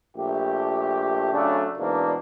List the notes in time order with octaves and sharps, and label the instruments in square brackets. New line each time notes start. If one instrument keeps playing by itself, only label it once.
[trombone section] A#1 A3 G4
C#3 F#3 A3 D4
E2 G#2 B2 A#3 D4